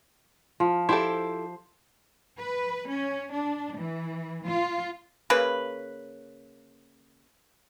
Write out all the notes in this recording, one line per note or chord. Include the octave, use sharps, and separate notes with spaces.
F3
E4 G4 A4 C5
B4
C#4
D4
E3
F4
C#3 A#3 B4